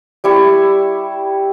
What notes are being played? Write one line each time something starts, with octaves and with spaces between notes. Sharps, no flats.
G3 E4 C#6